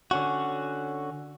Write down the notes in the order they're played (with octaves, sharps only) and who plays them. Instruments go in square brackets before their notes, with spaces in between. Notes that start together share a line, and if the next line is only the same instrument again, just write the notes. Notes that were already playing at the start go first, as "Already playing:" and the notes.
[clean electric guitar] D3 C#4 F#4